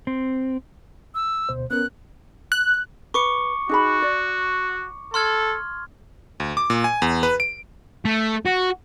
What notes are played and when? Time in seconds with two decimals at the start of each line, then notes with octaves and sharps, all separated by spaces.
0.07 C4
1.15 E6
1.49 D2 B2 C5
1.71 B3 C#4 A#4 F#6
2.52 F#6
3.14 B4 C#6 D6 C#7
3.69 D#4 F#4 G#4 B5
4.02 D5
5.14 A4 C6 F6 G#6
6.40 D2
6.57 D6
6.70 A#2
6.84 G#5
7.02 E2
7.23 B4
7.40 D7
8.05 A3
8.46 F#4